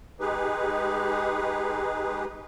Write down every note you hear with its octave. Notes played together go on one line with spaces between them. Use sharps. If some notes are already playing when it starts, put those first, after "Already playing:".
G#3 D#4 G4 G#4 B4